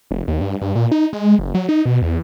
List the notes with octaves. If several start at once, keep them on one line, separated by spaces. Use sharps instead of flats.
F1
D#2
G2
G2
A#2
D#4
G#3
F#1
F#3
D#4
B2
E2